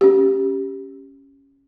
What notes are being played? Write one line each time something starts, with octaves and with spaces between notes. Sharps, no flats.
C#4 G4